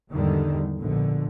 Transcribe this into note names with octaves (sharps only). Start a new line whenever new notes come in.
E2 G#2 D3 D#3 G3
A#1 B2 D3